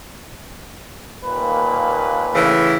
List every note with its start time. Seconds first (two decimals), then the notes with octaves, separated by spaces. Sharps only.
1.25 D#2 A#2 B4
2.34 A2 C#3 E3